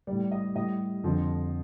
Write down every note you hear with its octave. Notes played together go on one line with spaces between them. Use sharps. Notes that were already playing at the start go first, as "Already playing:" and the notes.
A2 G3 D5
D#5
A2 G3 D#5
F2 D3 F3